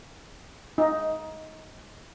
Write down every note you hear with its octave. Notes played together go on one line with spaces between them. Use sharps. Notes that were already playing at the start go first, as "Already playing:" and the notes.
D#4